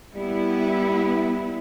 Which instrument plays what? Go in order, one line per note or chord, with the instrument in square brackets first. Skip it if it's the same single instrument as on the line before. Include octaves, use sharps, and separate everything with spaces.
[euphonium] G3 [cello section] B3 E4